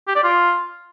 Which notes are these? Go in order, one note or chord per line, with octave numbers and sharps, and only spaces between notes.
G4
D5
F4